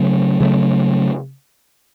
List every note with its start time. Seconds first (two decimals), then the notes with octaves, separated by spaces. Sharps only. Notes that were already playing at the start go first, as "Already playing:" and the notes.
Already playing: C#3 F#3 A3
0.40 C#3 F#3 A3